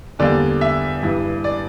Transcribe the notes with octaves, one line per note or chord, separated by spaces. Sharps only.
E2 D3 G3 A#3 D5
E5
G2 E3 G3
D5